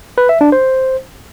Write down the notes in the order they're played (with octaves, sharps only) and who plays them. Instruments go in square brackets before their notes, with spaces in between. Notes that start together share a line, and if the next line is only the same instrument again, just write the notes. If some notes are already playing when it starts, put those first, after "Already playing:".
[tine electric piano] B4
E5
D4
C5